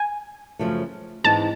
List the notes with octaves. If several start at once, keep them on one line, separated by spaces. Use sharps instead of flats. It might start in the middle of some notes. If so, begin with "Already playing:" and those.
Already playing: G#5
F#2 C#3 F3 A3
G#2 E3 G#3 C4 D#4 A5